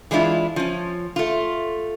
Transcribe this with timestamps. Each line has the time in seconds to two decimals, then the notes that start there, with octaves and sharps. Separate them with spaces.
0.11 E3 G#3 D4 E4 F4
0.56 F3 C#4
1.16 A3 F4